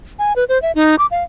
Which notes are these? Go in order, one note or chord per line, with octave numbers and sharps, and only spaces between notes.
G#5
B4
C5
E5
D#4
D6
F5